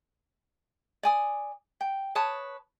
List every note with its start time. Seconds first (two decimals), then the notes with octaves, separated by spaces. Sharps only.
1.03 D5 G#5 D#6
1.81 G5
2.15 B4 C#5 A5 D#6